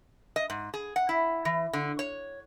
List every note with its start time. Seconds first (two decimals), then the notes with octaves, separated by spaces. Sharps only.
0.36 D#5
0.50 G#2
0.74 G#4
0.96 F#5
1.09 E4
1.45 E3
1.73 D3
1.99 C#5